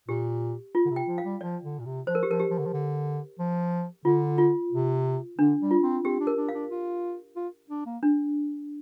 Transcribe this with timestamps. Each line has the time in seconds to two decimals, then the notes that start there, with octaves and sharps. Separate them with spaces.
0.08 A#2 G4
0.75 F4
0.86 D3
0.90 C3
0.96 G5
1.08 F3
1.18 F5
1.24 G3
1.41 F3 D5
1.63 D3
1.79 A#2
1.85 C3
2.06 F3 C5
2.15 A#4
2.23 G4
2.29 F3 A#4
2.39 G4
2.50 F3
2.59 D3
2.66 F3
2.73 D3
3.39 F3
4.05 D3 F4
4.38 F4
4.72 C3
5.38 D3 D4
5.60 G3
5.71 F4
5.82 C4
6.04 C4 G4
6.20 D4
6.27 A#4
6.37 D4
6.49 F5
6.54 D4
6.71 F4
7.36 F4
7.70 D4
7.86 A#3
8.03 D4